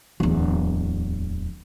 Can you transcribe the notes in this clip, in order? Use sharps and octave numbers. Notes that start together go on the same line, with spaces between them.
D1 E2